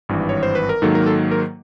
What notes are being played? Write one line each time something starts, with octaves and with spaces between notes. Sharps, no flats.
G#1 G2 E3
C#5
C5
B4
A#4
G#2 D#3 F#3 A#3 A4
A#4
A4
A#4